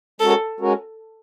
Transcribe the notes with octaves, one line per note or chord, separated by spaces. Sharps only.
G#3 C#4 F#4 A4 A#4
G#3 C#4 F#4 A#4